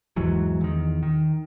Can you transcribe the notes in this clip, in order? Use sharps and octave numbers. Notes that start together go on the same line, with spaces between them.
E2 G#2 E3 F#3
E2 D#3
D#3